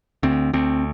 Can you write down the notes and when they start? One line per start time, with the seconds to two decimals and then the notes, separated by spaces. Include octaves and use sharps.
0.23 D2 C4
0.53 D2 C4